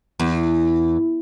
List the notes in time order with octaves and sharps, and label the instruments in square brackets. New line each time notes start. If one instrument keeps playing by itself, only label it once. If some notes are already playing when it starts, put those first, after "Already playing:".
[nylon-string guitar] E2